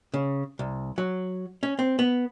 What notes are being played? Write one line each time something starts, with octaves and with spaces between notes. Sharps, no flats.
C#3
C2
F#3
C#4
C4
B3